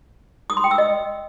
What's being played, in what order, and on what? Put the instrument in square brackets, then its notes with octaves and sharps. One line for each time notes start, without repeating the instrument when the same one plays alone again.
[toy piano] D#6
C6
G5
E6
D#5